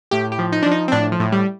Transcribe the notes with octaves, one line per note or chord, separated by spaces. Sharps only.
A2 G4
G4
F3
D#4
F3 D4
D#4
C4
A2 D4
F3
A2
G3